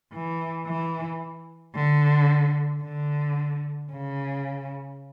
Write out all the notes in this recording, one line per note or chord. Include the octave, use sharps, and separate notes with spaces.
E3
E3
D3
D3
C#3